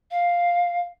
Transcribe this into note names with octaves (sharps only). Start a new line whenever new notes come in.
F5